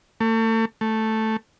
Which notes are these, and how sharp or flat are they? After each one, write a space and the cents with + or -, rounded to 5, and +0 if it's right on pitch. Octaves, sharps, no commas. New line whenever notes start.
A3 +35
A3 +0